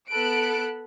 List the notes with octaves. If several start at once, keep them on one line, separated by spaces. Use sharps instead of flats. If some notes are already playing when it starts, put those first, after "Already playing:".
B3 A4 B5 F#6 D7